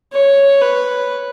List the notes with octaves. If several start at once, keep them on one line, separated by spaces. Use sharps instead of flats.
C#5
B4